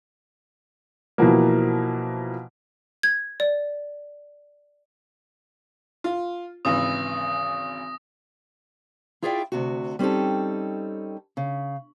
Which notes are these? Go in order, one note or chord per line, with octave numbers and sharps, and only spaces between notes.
B2 E3 F3 A#3
G#6
D5
F4
G#1 C#3 E3 D#6 A#6
E4 F4 G#4 D5 E5 G5
D2 C3 F#4
G3 C4 C#4 D#4 A4
C#3